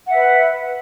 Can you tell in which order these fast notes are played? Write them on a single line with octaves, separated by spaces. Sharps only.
F#5 E5 B4